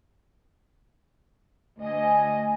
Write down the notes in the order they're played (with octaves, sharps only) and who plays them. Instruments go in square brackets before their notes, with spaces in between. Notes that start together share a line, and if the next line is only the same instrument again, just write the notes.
[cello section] D2 D#5 [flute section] G#5